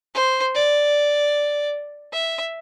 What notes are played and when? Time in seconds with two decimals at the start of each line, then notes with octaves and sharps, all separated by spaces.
0.15 C5
0.55 D5
2.13 E5